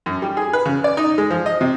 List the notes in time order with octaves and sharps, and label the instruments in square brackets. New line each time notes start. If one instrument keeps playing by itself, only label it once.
[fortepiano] F#2
G3
G#4
B4
C#3
D5
D#4
G#3
F3
D#5
C3